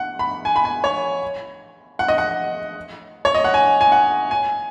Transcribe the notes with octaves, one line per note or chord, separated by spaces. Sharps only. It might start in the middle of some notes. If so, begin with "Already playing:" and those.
Already playing: F#5
B5
G#5
B5
G#5
C#5
F#5
D#5
F#5
C#5
D#5
F#5
G#5
G#5
F#5
G#5